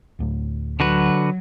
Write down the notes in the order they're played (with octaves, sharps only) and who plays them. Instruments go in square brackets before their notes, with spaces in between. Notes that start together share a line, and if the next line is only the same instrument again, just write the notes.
[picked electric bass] D1 D2 A2
[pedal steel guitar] D3 F#4 B4 [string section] F#3